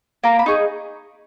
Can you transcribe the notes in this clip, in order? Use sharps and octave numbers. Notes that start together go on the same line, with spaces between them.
A#3 A#5
B5
D#4 G#4 C#6